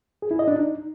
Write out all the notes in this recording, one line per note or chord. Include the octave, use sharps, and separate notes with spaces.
G#4
E4
D#5
D4
D#4